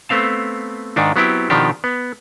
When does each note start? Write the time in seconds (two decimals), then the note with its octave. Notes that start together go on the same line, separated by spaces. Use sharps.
0.09 A3 B3 C4 F5 A5
0.96 G#2 D#3 D4 D#4
1.16 F#3 B3 C4 E4 G4
1.50 B2 D#3 F3 D4 G4
1.84 B3